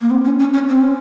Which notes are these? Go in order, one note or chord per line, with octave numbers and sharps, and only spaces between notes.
A#3
C4
C#4
C#4
C#4
C4
C#4